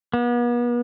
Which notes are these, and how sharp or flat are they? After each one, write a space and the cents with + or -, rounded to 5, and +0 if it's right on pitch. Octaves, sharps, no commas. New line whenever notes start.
B3 -40